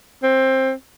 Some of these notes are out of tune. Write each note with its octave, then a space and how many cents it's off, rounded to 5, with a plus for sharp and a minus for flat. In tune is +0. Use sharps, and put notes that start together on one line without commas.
C4 +15